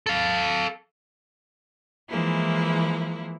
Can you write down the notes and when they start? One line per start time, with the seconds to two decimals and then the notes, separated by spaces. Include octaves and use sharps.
0.06 A4 F5
2.09 E3 F3 G#3 A#3 E4